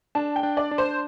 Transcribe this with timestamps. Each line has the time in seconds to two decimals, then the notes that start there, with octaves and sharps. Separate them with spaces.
0.15 D4 A5
0.36 G5
0.43 D4
0.57 D5
0.71 D4
0.78 C5